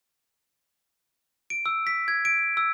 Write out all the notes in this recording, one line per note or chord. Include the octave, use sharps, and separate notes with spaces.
D7
E6
B6
G#6
D7
E6